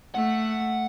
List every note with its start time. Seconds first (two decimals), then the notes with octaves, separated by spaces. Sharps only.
0.15 A3 F#5